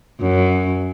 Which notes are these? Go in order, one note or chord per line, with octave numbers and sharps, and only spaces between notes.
F#2